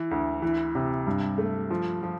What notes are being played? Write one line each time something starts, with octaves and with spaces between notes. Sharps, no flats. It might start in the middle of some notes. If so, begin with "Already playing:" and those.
Already playing: E3
D2
E3
C3
G2
A3
F3
F3